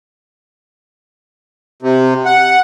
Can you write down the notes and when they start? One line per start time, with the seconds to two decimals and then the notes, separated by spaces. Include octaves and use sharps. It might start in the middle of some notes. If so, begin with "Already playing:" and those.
1.82 C3
2.26 F#5